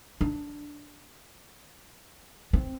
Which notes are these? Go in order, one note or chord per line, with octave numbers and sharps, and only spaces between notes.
D4
C4